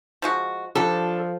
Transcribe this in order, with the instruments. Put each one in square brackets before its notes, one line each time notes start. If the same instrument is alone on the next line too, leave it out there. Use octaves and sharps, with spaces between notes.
[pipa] F3 G#3 F#4
[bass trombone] F3 [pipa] G3 D4 [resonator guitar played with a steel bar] A4